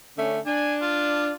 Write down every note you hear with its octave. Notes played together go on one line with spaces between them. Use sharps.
D3 A3 C#4
D4 G#5
F4